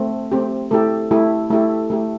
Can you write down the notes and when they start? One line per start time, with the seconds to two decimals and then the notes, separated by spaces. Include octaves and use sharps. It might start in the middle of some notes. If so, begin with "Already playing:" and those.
Already playing: A3 C4
0.32 A3 C4 G4
0.71 A3 E4 G4 A4
1.11 A3 E4 G4
1.50 A3 E4 G4 A4
1.90 A3 E4 G4